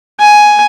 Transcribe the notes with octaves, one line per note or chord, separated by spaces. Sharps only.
G#5